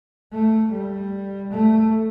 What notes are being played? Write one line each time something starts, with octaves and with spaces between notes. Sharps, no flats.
A3
G3
A3